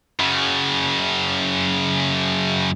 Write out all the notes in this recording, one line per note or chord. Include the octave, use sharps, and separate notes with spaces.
F#2 C#3